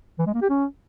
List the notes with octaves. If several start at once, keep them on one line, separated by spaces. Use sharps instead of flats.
E3
G#3
A#3
G4
C#4